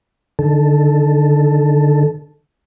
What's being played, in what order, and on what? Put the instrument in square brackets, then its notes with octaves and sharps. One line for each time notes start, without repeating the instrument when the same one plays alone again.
[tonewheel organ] D3 D#3 A4